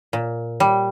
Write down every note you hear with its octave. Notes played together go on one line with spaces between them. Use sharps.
A#2
G3